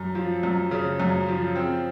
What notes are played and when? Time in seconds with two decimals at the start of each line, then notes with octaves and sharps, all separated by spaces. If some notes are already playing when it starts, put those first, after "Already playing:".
Already playing: F#2
0.15 F3
0.43 F#2
0.71 C#3
1.00 F#2
1.28 F3
1.55 C4